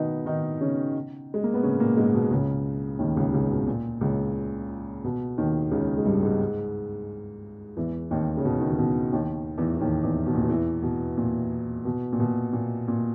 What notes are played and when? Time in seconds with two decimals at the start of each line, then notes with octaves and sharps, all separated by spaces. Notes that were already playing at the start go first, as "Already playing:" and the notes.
Already playing: B2 D#3 B3 D#4
0.26 D#3 D#4
0.61 C#3 C#4
1.34 G#3
1.44 A#3
1.54 B3
1.63 C#3 C#4
1.80 A#2 A#3
1.97 G#2 G#3
2.14 B2
2.31 C#2 C#3
2.99 D#2 D#3
3.16 C#2 C#3
3.33 C#2 C#3
3.50 B2
3.67 A#2
4.01 C#2 C#3
5.04 B2
5.38 D#2 D#3
5.71 C#2 C#3
5.97 G#3
6.05 G2 G3
6.22 G#2 G#3
7.77 E2 E3
8.11 D#2 D#3
8.37 C#3
8.45 B2
8.60 D#3
8.70 C#3
8.78 B2
9.13 D#2 D#3
9.58 E2 E3
9.76 E3
9.80 D#2 D#3
10.03 E2 E3
10.26 B2
10.34 A#2
10.41 B2
10.49 E2 E3
10.83 B2
11.17 A#2
11.85 B2
12.12 A#2
12.20 B2
12.53 A#2
12.88 A#2